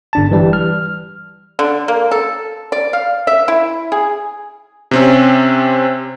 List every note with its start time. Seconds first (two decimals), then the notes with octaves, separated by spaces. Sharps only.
0.13 G1 D4 A5
0.31 E3 G3
0.53 F6
1.59 D3
1.88 A#3
2.11 A4
2.72 D5
2.93 F5
3.27 E5
3.48 E4
3.92 G#4
4.91 C3 C4 C#4